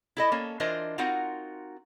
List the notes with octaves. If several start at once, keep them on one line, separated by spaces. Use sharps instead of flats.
E4 A4 D#5
A#3 C#4 A4
E3 D4 F4 A#4 C5 D#5
C4 D#4 F4 F#4 A#4 F#5